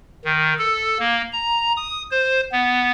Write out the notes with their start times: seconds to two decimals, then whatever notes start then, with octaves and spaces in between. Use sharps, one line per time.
0.25 D#3
0.59 A4
0.99 A#3
1.32 A#5
1.77 D#6
2.11 C5
2.52 B3